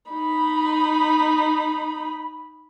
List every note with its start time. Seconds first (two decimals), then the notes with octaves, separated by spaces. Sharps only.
0.11 D#4 B5